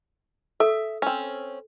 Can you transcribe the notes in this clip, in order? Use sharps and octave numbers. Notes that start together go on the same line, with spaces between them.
A4 E5
C4 C#4